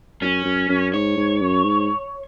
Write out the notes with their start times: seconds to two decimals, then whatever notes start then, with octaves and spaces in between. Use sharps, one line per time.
0.21 F#2 C#4
0.45 F#2
0.69 F#2
0.94 G#2 C#5
1.17 G#2
1.41 F#2
1.64 G#2